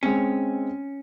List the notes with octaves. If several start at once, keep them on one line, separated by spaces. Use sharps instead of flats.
G#3 C4 C#4